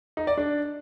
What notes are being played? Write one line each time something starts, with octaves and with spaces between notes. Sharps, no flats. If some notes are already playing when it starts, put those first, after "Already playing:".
D#4
D5
D4